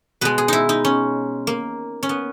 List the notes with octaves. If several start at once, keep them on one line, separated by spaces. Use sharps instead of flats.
B2 G#3 B4
G#4
D#4 E4
D#4
C#4
A#3
C#4
B3